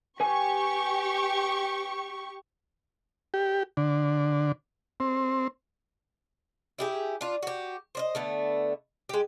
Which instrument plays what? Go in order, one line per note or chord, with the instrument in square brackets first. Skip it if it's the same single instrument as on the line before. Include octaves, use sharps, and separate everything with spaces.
[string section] G4 C#6 [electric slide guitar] B4 G#5
[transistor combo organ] G4
D3
C4
[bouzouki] E4 G4 G#4
D4 F4
F#4 G4
C5 D5 D#5
D3 A3 B3
G#3 G4